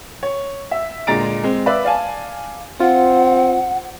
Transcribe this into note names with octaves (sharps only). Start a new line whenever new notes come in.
C#5
E5
D2 A#2 G#3 A#5 A6 D7
G#3 C4
B4 D5 E5 F5 B5
D5 F5 G#5 A5
C4 F4 F#5